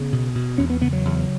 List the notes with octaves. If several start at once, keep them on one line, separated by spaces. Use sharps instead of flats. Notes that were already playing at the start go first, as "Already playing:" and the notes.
Already playing: C#3 B3
B2
B2
E2 C#4
B3
C#3 B3
F#3
E2